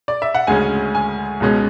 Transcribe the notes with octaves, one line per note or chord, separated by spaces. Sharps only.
D5
E5
F#5
D2 C#3 G#3 C#4 G#5
G#5
C#2 B2 G#3 C#4